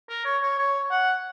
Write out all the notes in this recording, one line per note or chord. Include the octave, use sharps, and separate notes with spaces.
A#4
C#5
C#5
C#5
F#5